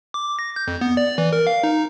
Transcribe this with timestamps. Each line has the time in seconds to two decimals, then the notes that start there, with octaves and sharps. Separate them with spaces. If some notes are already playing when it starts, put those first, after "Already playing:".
0.14 D6
0.39 A#6
0.56 G6
0.68 F2
0.81 B3
0.97 D5
1.18 E3
1.33 A#4
1.47 F5
1.63 D#4